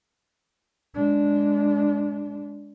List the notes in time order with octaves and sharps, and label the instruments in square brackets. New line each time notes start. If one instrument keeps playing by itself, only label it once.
[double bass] G#3 D4